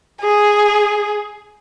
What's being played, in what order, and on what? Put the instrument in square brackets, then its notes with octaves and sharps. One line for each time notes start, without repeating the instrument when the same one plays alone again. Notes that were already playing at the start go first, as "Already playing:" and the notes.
[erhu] G#4